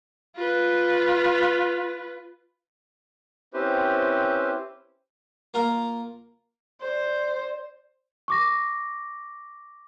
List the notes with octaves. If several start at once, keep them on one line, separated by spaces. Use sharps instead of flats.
F4 B4
C4 C#4 E4 G4 B4 C5
A#3 F4 A#4
C5 D5
C#6 D6 A#6